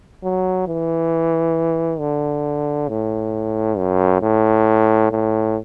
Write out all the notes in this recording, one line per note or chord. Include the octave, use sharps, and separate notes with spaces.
F#3
E3
D3
A2
F#2
A2
A2